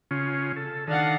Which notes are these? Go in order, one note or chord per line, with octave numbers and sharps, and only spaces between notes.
C#3 C#4 F4
A4
D#3 D4 A4 F5 F#5